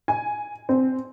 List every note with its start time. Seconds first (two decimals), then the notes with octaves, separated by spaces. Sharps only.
0.08 G#5
0.69 C4